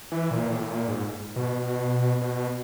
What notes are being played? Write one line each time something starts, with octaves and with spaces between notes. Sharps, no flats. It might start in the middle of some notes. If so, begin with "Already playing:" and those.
E3
A#2
A2
A#2
G#2
B2
B2